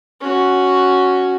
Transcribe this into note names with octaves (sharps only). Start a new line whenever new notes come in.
C#4 F#4